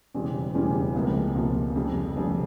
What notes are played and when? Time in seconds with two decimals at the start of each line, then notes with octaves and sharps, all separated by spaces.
0.14 E1 E2 C#3 G3 C4
0.54 E1 E2 C#3 G3 C4
0.94 C#2 C3 F3 A#3
1.35 C#2 C3 F3 A#3
1.76 F1 F2 C#3 G3
2.16 F1 F2 C#3 G3